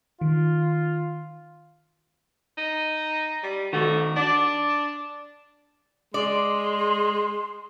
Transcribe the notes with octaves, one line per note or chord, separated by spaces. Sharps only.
D#3 F4
D#4
G3
D#3 A3 F#4
D4 D5
G#3 D5 C6